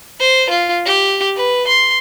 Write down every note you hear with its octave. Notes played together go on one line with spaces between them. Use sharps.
C5
F4
G4
B4
C6